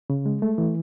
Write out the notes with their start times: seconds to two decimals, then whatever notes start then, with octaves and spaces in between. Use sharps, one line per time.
0.10 C#3
0.26 G#3
0.42 A3
0.58 E3